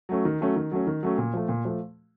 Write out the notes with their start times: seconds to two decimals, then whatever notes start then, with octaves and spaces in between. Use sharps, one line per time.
0.09 F#3 A3 C#4
0.25 D#3
0.41 F#3 A3 C#4
0.56 D#3
0.72 F#3 A3 C#4
0.87 D#3
1.03 F#3 A3 C#4
1.18 A#2
1.33 F3 A3
1.49 A#2
1.65 F3 A3